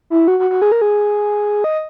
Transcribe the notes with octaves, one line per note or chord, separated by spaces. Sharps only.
E4
F#4
F#4
F#4
G#4
A#4
G#4
D#5